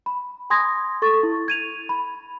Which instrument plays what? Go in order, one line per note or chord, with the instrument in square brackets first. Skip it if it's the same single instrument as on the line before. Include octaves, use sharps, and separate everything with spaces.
[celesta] B5
G#5 C6 D#6 G#6 A#6
A4 C#6 A6
E4
G#6 D#7 F7
B5